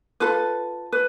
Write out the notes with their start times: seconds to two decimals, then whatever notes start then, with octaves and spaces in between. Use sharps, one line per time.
0.20 F4 A4 B4
0.92 B4